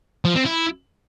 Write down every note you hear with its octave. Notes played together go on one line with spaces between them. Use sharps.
F3
C4
E4